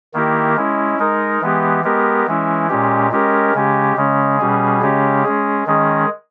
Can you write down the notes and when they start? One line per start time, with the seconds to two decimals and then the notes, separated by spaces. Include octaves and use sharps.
0.14 D#3 A#3 E4 G4 A#4
0.56 G#3 C#4 E4
0.99 G#3 D#4 A#4
1.41 E3 G#3 B3 G4
1.84 G#3 B3 G4 A#4
2.26 E3 G#3 C#4 E4
2.69 A#2 G#3 C#4 G4
3.11 G#3 C#4 G4 A#4
3.54 C#3 G#3 C#4 G4
3.96 C#3 G#3 C#4
4.39 B2 G3 C#4 G#4
4.82 C#3 G#3 C#4 G4
5.24 G#3 C#4 G#4
5.66 D#3 G#3 C#4 G#4